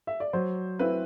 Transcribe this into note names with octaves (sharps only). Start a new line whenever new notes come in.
E5
D5
F#3 C5
C4 E4 B4